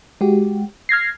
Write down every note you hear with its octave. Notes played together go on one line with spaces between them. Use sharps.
G#3 F#4 G4
F6 G#6 A#6 C7